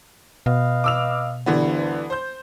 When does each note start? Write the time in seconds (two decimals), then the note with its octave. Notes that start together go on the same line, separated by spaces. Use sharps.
0.46 B2 B4 D#5 F5
0.84 D6 E6 F7
1.46 D2 G2 D3 E3 B3
2.10 C5 G6